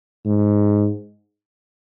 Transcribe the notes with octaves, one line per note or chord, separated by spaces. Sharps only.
G#2